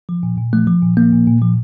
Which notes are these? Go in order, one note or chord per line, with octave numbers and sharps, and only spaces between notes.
F3
A#2
A#2
F3 A3
F3
A#2
F3 A#3
A#2
A#2
F3